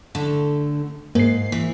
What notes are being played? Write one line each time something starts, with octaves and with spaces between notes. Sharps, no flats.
D3 A3
G#2 A#3 C7
E3